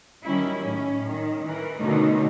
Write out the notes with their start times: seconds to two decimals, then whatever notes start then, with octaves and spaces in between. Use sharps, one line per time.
0.24 D#3 F#3 G3 C#4 E4
0.59 A2 C#4
1.06 D#3
1.46 E3 A#4
1.77 B2 D3 D#3 A3 C#4 D#4